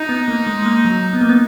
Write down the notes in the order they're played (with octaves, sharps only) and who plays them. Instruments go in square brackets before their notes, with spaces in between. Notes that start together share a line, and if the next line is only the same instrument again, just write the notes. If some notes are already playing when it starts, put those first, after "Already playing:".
Already playing: [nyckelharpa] D#4
[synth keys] B3
A#3
G#3
G#3
A#3
F#3
B3
A#3
B3